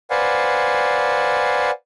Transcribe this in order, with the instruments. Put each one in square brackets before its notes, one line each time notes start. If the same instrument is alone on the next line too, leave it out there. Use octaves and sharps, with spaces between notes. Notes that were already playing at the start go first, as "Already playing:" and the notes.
[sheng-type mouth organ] B4 C5 D5 F5 F#5 G#5